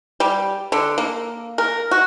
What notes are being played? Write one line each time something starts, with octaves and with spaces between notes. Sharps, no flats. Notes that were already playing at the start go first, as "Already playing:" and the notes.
G3
D3
A#3
A#4
F#4